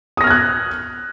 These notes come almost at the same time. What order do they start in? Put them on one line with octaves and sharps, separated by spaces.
D#6 A#6 F6 G#6 F#6